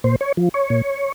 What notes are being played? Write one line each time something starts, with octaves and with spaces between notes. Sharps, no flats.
A#2 C5
C#5
F3
C#5
A#2